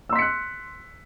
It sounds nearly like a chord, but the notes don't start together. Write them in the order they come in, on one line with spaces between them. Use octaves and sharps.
E6 C6 B6 C#7 F#6